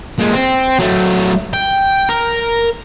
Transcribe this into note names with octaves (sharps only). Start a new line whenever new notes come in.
A#2 G#3
C4
F#3 A3
G5
A#4